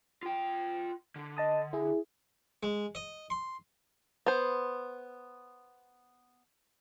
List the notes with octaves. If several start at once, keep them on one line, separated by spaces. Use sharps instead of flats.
F4 G5
D3
D#5 A5 D#6
E4 G#4
G#3
D#5
C6
B3 C5